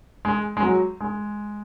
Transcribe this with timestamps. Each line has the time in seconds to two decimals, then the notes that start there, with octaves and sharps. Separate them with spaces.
0.25 G#3
0.57 G#3
0.62 F#3
1.00 G#3